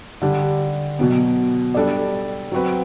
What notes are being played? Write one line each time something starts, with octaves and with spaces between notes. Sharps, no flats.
D3 G3 D4 G4
B2 F#3 B3
G3 D4 A4 D5
F#3 C4 F#4 B4